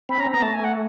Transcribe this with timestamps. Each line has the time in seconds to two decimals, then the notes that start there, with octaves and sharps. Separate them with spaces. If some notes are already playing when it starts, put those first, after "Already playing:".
0.09 C4 B5
0.18 C#4 A#5
0.26 C4
0.31 B3 A#5
0.42 A3 A5
0.54 G#5
0.64 F#5